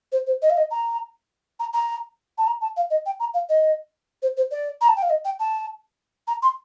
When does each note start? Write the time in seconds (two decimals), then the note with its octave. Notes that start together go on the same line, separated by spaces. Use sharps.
0.12 C5
0.27 C5
0.42 D#5
0.50 F5
0.57 D#5
0.71 A#5
1.60 A#5
1.73 A#5
2.38 A5
2.47 A#5
2.61 A5
2.77 F5
2.91 D#5
3.06 G5
3.20 A#5
3.34 F5
3.49 D#5
4.22 C5
4.37 C5
4.51 D5
4.81 A#5
4.88 A5
4.96 G5
5.02 F5
5.10 D#5
5.25 G5
5.39 A5
6.28 A#5
6.42 C6